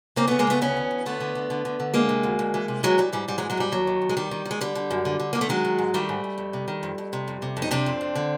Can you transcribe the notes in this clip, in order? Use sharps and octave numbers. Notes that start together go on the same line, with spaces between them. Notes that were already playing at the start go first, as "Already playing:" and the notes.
C#3 A#3 C4
C#3 A3 B3
G#3 A#3
C#3 A3 B3
D2 B3 C#4
E3
D2
D3 A3 B3
D3
D3
D3
D3
D3
D2 G#3 A#3
C3
D2
D2
E3
C3
E3 F#3 G#3
E3 G3
G#2 G3
G#2 G3
F#3 G#3
E3
F#3 G#3
G#2 G3
D#2 F#3
D#3
D#2
G#3
D#3 G3
D#3
D#3
G#3
D3 G3
D3
F#2
D3
D3
D3 A#3
A3
D#3 F#3 G#3
D#3
G#2
D#3 G3 A3
G#2
G#2
F2
C3
D#3
F2
F2
C3
F2
C3
F2
D#4
C3 C4 D4
F2
F2
D3